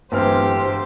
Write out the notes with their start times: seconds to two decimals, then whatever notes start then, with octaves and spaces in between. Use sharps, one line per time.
0.12 D1 G1 E3 G4 C5 F6